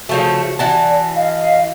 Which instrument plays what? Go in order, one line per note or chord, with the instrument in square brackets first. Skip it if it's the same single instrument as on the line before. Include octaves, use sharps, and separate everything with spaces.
[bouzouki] C#3 F3 A3 [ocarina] F#4
[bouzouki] E3 F#4 A5 [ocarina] D5
[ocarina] D#5 [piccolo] F5